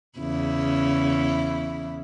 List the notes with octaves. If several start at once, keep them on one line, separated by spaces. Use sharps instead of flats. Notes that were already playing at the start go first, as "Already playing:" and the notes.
E2 C#3 E4